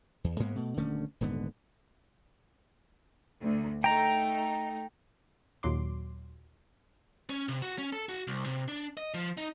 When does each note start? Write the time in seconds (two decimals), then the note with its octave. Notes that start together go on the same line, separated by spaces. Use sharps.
0.24 E2
0.40 G#2 G#3 A#3 B3
0.56 B2 A3
0.77 D#1 D3 A3 C#4
1.21 D#1 G#2 D3 B3
3.40 D2
3.84 A3 D#4 G5 A#5
5.63 D#2 A#2 F#3 C6 D6
7.30 C#4
7.49 C3
7.62 F#4
7.78 C#4
7.92 A4
8.09 F#4
8.27 C2
8.46 C3
8.68 D4
8.97 D#5
9.14 F3
9.37 D#4